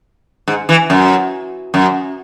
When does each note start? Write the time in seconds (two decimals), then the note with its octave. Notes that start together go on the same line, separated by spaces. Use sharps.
0.48 G#2
0.69 E3
0.90 F#2
1.74 F#2